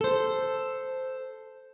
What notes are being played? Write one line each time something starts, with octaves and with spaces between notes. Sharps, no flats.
A4 C5